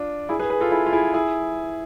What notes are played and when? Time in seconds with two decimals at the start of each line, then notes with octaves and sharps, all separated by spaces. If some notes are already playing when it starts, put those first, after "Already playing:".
Already playing: D4 F4
0.29 E4 G#4
0.40 G#4 B4
0.50 G#4 B4
0.61 F4 A4
0.71 E4 G#4
0.86 F4
0.93 E4 G#4
1.14 E4 G#4